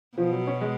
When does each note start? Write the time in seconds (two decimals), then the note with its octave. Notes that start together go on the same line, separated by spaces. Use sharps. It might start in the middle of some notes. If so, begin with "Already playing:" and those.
0.17 B2 F3
0.32 F#3
0.47 C#4
0.61 G#3